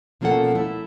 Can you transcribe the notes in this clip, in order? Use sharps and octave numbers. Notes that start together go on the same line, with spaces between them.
B2 F3 A#3 C#4 A4 F#5
A3 E4